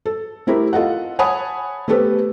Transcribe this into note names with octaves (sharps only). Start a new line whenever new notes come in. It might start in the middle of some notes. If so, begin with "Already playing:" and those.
A4
A3 C4 E4 G4 A#4
F4 A4 D#5 F#5
C#5 F#5 G#5 A5 B5 D#6
A3 B3 G4 A4 B4 C5